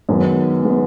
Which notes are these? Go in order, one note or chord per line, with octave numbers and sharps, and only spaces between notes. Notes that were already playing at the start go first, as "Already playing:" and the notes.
F#2 D#3 G#3 B3
D#3 G#3 B3